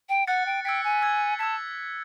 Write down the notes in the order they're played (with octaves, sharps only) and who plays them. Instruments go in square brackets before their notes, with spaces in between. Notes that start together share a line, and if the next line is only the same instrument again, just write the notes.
[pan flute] G5
[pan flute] F#5 [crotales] F#6 A6 C#7
[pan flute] G5
[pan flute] G5 [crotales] E6 G#6 B6
[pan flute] G#5
[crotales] E6 G#6 B6
[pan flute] A5 [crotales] E6 G#6 B6